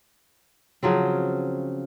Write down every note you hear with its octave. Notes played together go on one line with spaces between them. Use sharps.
C#3 F3 F#3 C4